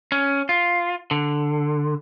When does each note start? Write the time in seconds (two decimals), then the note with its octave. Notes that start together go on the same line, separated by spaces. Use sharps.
0.12 C#4
0.49 F4
1.11 D3